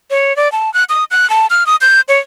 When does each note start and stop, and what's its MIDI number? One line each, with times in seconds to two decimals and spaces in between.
0.11 0.35 73
0.36 0.51 74
0.52 0.72 81
0.74 0.84 90
0.89 1.04 87
1.11 1.29 90
1.30 1.47 81
1.50 1.66 89
1.66 1.76 87
1.81 2.01 91
2.08 2.18 73